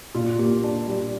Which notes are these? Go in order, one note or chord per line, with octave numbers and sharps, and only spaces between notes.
A#2 F4
A#3 G4
D4
G3